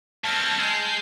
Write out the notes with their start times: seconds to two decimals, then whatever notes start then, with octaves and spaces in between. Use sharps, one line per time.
0.24 G2 C4 A5 F6 G#6
0.60 G#3 G6 C7